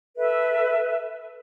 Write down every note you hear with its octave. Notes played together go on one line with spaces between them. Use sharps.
A4 B4 E5